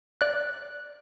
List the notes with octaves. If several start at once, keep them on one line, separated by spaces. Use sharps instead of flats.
D5 F#6